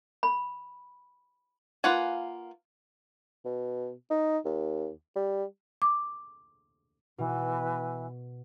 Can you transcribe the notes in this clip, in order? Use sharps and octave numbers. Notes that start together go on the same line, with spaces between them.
B5
A#3 F4 B4 F#5 G#5
B2
D#4
D#2
G3
D6
B2 E3